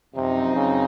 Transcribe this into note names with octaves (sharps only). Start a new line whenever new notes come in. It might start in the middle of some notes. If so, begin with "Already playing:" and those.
F#2 C3 F3 C4 D#4
C#3